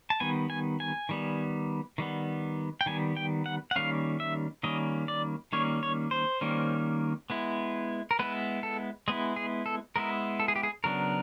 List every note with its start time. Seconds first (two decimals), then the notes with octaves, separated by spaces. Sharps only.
0.10 A5
0.20 D#3 G3 B3 G#5
0.50 G#5
0.80 G#5
1.09 D#3 G3 B3
1.98 D#3 G3 B3
2.81 G5
2.86 D#3 G3 B3 G#5
3.17 G5
3.46 F#5
3.71 F#5
3.76 D#3 G3 A#3 C#4 F5
4.20 E5
4.63 D#3 G3 A#3 C#4 D#5
5.08 D5
5.53 D#3 G3 A#3 C#4 C#5
5.83 C#5
6.11 C5
6.41 D#3 G3 A#3 C#4
7.30 G#3 B3 E4
8.11 A#4
8.19 G#3 B3 E4 B4
8.63 A4
9.08 G#3 B3 E4 G#4
9.36 G#4
9.66 A4
9.96 G#3 B3 E4 A#4
10.40 A4
10.48 G#4
10.56 G4
10.63 G#4
10.84 C#3 F#3 B3 D4 A#4